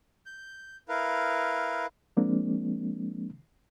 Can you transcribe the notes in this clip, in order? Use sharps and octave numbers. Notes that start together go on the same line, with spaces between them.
G6
E4 A#4 B4 F5
F3 G#3 A#3 C4 D4